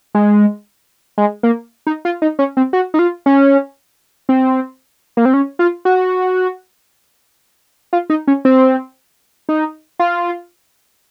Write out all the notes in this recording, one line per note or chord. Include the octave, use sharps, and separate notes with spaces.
G#3
G#3
A#3
D#4
F4
D#4
C#4
C4
F#4
D#4
F4
C#4
C4
A#3
C4
C#4
F4
F#4
F4
D#4
C#4
C4
D#4
F4